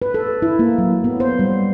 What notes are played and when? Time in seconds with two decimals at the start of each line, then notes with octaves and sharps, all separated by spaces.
0.02 B4
0.14 A4
0.42 E4
0.59 A#3
0.78 F#3
1.04 B3
1.20 C5
1.39 G3